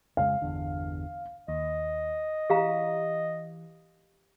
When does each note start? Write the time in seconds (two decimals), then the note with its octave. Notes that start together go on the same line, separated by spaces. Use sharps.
0.17 F2 C#3 G#3 F5
0.42 G1 E2 D3
1.48 D#2 D#5
2.50 E3 G4 F5 A#5